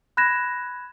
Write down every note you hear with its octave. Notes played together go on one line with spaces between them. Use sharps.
B5 F#6 G#6 A#6 E7